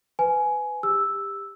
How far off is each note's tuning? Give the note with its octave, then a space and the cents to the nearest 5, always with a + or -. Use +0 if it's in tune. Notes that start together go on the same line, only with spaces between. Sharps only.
B4 +25 G#5 +15
G4 +25 E6 +0